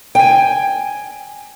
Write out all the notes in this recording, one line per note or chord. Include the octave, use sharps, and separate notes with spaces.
G5 G#5